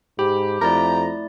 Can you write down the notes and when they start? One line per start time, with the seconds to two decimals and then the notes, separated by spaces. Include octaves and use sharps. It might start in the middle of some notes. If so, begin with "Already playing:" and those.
0.19 G#2 G4 B5
0.61 F2 A3 E4 D5 A#5